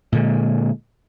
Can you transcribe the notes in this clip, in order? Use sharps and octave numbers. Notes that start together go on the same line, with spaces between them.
A#2 D3 G#3